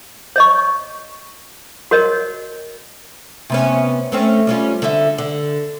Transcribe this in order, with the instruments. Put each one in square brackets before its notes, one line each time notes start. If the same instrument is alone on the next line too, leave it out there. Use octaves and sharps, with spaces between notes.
[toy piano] C#5 D#5 C#6
F#4 A#4 C#5 D#5
[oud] C3 B3 C#4
A3 C4 C#4
G3 C#4 F4
D3 E5
D3